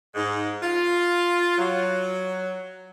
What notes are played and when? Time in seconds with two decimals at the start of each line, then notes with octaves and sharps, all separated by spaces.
0.15 G#2
0.63 F4
1.58 F#3